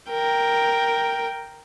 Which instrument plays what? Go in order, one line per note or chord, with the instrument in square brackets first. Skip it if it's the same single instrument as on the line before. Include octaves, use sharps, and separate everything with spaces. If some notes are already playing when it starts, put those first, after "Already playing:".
[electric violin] A#4 G5